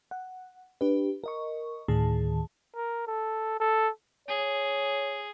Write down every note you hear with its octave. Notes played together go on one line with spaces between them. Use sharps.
F#5
D4 G4 B4
A#4 D#5 C#6
D2 A2 D#3 G#4 A5
A#4
A4
A4
G#4 C#5